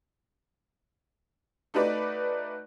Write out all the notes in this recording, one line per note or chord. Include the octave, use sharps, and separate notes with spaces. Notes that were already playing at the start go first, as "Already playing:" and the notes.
A3 D#4 F#4 B4 D5